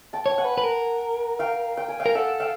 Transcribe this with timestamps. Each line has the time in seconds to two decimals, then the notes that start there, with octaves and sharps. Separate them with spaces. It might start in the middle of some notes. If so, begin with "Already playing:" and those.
0.13 G5 A5
0.26 C#5 G5
0.38 F#5 G#5
0.45 B4
0.58 B4
0.64 A#4
1.39 F5 G5
1.77 G5
1.88 G#5
2.00 F5 G5
2.06 A#4
2.15 A4 E5 F#5
2.40 F5 G5